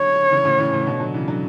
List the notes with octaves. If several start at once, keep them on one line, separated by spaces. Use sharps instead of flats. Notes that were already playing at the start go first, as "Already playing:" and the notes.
Already playing: D3 F#3 C#5
C#3 E3
A2 C#3
C#3 E3
A2 C#3
B2 D3
D3 F#3
C#3 E3
D3 F#3